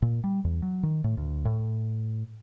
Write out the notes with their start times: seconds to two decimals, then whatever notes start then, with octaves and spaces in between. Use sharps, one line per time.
0.02 A#2
0.24 G3
0.44 E2
0.62 F#3
0.83 D#3
1.04 A2
1.17 D2
1.45 A2